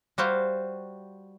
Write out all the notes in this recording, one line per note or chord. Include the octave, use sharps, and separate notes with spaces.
G3 F#4 C5 F5